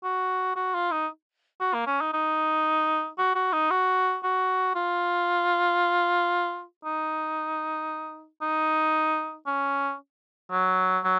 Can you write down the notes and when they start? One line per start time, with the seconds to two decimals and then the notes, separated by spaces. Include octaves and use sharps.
0.04 F#4
0.56 F#4
0.74 F4
0.91 D#4
1.61 F#4
1.74 A#3
1.87 C#4
2.01 D#4
2.13 D#4
3.18 F#4
3.35 F#4
3.53 D#4
3.71 F#4
4.24 F#4
4.75 F4
6.85 D#4
8.42 D#4
9.47 C#4
10.52 F#3
11.04 F#3